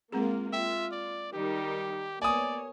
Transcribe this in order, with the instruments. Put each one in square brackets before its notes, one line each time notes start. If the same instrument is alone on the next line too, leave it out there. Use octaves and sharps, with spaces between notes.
[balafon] G#3 C4 G#4 [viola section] A#3 F4
[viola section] F4 [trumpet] E5 [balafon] G5
[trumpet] D5
[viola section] D#3 G3 D#4 [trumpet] G4
[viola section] A#3 B3 C#5 [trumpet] D5 [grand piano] G#5 D#6